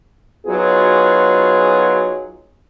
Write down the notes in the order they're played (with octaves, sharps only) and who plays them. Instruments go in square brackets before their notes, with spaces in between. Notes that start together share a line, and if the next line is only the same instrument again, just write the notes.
[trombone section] F#3 B3 D#4 F4 F#4 G#4